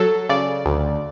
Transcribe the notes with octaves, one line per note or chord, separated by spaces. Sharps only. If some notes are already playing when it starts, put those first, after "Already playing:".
Already playing: F#3 A4
C#3 D5
D2